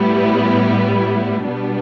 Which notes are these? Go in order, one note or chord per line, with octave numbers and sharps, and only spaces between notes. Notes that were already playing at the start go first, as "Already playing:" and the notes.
Already playing: A2 G3 B3 E4
B2 G3 B3 D4